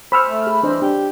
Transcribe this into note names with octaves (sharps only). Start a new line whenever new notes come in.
C5 G#5 B5 C#6 E6 F6
A3
G#4
E3 D4 C5 D#5
D4 G4